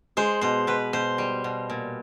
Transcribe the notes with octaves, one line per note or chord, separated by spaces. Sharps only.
G#3 C5
B2 C5
B2 B4
B2 C5
G3
B2
A#2